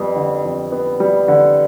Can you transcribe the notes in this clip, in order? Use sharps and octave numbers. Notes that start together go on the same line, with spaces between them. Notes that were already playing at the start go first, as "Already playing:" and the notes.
Already playing: F2 G3 B3
D3
F2
B3
G3
D3